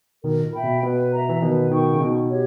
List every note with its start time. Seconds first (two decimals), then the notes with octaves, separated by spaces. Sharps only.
0.24 B2 D#3 A#4
0.44 A#2
0.53 E5 G5 B5
0.64 B2
0.83 B2 B4
1.13 E5 A#5
1.29 E3
1.41 B2 D#3 B4
1.71 B2 D#3 G5 C#6
1.94 C#3
2.00 B2 D#4
2.29 G4 C#5